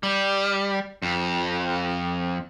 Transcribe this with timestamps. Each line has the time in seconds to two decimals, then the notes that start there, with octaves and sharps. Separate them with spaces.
0.03 G3
1.02 F2